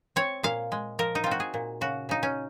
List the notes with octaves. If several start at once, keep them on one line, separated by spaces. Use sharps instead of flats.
C4 C#5
A#2 F5
G#3
F3 A#4
D#4
C4 F4
F#4
G#4
A#2
C#3 F#4
C#3 D#4
C#4